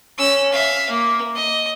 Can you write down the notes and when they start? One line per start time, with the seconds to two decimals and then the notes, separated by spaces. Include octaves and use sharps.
0.18 C#4 E6
0.52 E5 F5
0.90 A#3
1.35 D#5